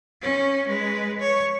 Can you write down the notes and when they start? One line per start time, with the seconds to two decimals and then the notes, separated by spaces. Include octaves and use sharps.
0.22 C#4
0.68 G#3 B4
1.19 C#5